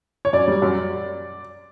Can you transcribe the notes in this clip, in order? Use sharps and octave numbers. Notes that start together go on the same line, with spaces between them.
C#5
F#2 D5
G3
F#2